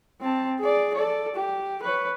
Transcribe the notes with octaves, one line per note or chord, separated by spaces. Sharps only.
C4 A5
G#4 D5
A4 D5
G4
B4 C#5